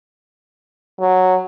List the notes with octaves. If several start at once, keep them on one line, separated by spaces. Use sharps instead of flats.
F#3